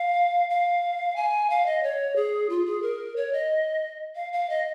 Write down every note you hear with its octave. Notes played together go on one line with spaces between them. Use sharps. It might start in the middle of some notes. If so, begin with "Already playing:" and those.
Already playing: F5
F5
G#5
F5
D#5
C#5
G#4
F4
G#4
A#4
C#5
D#5
F5
F5
D#5